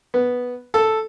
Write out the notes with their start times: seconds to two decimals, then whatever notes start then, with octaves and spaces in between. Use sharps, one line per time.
0.14 B3
0.74 A4